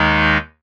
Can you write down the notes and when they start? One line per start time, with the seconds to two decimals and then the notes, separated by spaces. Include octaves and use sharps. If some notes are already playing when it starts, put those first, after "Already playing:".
Already playing: D#2 D#3 G#3 D#4